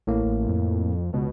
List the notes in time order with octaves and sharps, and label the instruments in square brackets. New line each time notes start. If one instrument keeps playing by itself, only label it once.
[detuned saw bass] A1 [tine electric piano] A2 A#3
[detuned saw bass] A1
F2
[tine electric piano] C#2 [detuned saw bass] B2